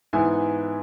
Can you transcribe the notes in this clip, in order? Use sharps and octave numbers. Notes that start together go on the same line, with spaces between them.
G#2 E3 B3 E5 G#5